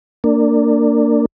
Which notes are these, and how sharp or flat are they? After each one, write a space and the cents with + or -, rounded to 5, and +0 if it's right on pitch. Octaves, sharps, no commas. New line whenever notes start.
A#3 -20 D4 +0